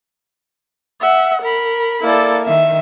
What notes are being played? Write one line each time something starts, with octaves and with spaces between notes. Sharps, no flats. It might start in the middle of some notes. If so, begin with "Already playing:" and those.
E5 F#5
A#4 B5
A#3 E4 A4 D5
D#3 E5